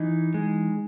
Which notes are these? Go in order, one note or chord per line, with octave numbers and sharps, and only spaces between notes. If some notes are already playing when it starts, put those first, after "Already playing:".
Already playing: E3 D#4
G#3